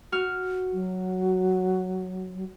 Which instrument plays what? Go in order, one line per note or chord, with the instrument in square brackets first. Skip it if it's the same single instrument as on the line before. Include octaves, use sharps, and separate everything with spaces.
[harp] F#4 F6
[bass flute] F#3